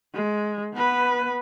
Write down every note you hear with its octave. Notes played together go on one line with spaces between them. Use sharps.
G#3
B3 B4